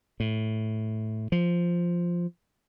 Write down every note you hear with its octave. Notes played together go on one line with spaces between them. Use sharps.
A2
F3